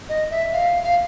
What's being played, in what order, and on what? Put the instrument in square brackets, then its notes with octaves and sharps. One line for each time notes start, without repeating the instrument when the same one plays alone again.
[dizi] D#5
E5
F5
F5